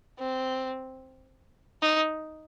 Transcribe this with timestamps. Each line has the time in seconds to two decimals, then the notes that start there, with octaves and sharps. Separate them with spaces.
0.19 C4
1.82 D#4